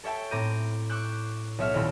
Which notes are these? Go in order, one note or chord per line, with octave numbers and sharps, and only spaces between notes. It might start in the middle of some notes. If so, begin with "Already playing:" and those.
A4 C#5 E5 G5 A5
A2 C4 A#5 D6 G6 D#7
C#6 D6 E6 F#6 G6
B1 C#5 E5 F6
D#1 A#2 C4 E4 A4 E6